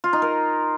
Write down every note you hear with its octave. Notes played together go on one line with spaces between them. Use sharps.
F4
D#4
A#4